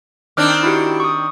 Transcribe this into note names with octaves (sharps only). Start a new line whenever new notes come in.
D#3 C4 D4 D6 F6 F#6
E4 F#4 G4
C#6 D#6